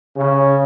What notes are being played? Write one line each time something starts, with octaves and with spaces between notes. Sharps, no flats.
C#3